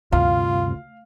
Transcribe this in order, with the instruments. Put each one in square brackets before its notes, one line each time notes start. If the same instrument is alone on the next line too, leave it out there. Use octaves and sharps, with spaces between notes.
[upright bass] D2 [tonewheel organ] G2 C3 [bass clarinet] F4 [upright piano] F5